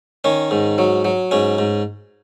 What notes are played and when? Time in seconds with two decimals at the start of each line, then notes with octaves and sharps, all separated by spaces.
0.24 D#3 C#4
0.51 G#2
0.78 F#3
1.05 F#3
1.31 G#2 C#4
1.58 G#2